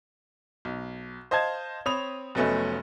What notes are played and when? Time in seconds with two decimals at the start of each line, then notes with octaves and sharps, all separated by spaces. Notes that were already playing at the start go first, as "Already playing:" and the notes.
0.65 B1
1.31 C5 D#5 F5 A5 G#6
1.86 C4 C#5 B5 D#6 F7
2.35 F1 F#3 A3 B3 C#4 D#5